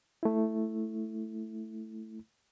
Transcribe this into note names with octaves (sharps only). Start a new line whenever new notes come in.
A3 E4